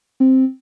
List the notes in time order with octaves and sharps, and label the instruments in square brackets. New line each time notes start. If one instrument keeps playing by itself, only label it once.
[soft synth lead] C4